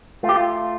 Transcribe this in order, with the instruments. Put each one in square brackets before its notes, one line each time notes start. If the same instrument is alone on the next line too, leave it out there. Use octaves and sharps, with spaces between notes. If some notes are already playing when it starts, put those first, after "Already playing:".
[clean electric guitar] A3 F4
G4
F4